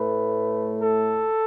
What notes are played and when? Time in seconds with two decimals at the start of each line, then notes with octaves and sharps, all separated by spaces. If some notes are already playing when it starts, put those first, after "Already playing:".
Already playing: A2 A3 B4
0.80 A4